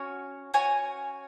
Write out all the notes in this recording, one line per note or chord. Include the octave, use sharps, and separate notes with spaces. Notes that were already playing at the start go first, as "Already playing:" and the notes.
Already playing: C#4 F#4 C#5 G#5
C#4 F#4 C#5 G#5